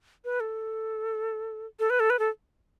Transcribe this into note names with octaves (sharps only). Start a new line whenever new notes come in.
B4
A4
A4
B4
A4
B4
A4